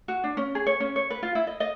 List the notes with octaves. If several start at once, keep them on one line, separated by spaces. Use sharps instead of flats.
F#4
D4
C#4
G#4
C#5
C#4
C#5
B4
F4
E4
D#5
D#5